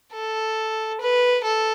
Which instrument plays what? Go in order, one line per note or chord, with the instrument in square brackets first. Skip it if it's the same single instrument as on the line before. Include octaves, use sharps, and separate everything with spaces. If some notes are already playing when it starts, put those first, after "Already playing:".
[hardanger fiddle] A4
B4
A4